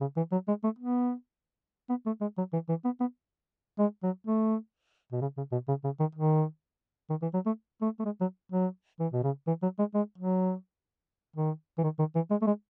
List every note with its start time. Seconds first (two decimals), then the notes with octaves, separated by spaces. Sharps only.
0.01 C#3
0.16 E3
0.32 F#3
0.48 G#3
0.64 A3
0.79 B3
1.89 B3
2.06 A3
2.21 G#3
2.38 F#3
2.53 E3
2.69 E3
2.84 B3
3.00 B3
3.79 G#3
4.03 F#3
4.27 A3
5.12 B2
5.21 C#3
5.37 C#3
5.52 B2
5.68 C#3
5.84 C#3
6.00 D#3
6.15 D#3
7.10 D#3
7.22 E3
7.34 F#3
7.46 A3
7.81 A3
7.99 A3
8.05 G#3
8.21 F#3
8.52 F#3
9.00 E3
9.13 B2
9.23 C#3
9.47 E3
9.62 F#3
9.79 G#3
9.94 G#3
10.18 F#3
11.36 D#3
11.78 E3
11.84 D#3
11.99 D#3
12.15 E3
12.31 G#3
12.42 A3
12.46 G#3